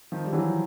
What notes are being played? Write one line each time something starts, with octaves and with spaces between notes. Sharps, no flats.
D#3 F3
G3
E3 F#3